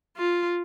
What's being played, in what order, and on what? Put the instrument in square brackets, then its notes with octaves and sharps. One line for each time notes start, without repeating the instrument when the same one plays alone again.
[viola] F4